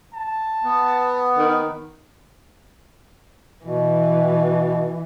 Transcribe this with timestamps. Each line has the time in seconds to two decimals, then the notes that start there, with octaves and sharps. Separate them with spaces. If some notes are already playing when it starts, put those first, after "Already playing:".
0.14 A5
0.64 B3
1.38 D#3
3.65 B2 E3